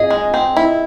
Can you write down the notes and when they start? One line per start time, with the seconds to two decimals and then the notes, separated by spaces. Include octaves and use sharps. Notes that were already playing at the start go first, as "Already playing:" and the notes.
Already playing: G#4 D#5
0.10 G#3
0.34 C4
0.57 E4